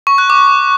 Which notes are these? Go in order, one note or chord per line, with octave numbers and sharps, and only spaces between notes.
C#6
F#6
D6